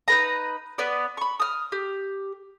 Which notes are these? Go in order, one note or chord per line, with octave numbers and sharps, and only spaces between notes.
D#4 B4 A#5
B3 B4 D5
B5 C#6
D#6 F6
G4